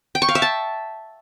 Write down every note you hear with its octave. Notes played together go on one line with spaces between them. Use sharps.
G5
C#6
F5
E5
A5